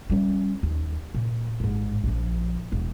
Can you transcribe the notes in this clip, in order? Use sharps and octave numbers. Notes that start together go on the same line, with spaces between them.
G3 C#4
D#2
A#2
A1 G#2
A#1 F3
E1 E2